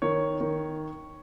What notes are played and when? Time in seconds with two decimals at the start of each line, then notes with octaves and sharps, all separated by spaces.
0.02 D#3 C#5
0.41 D#3